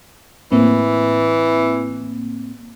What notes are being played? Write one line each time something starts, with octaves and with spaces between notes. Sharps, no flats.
A2 E3 A#3 C4